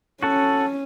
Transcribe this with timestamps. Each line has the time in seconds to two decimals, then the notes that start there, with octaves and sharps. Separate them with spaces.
0.23 C#4 F#4 A4 F#5